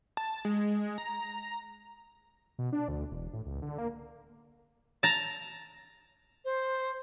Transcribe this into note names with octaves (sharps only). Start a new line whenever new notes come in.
A5
G#3
A#5
B2
D4
D2
E1
A2
C#2
D3
A#3
A5 A#5
C5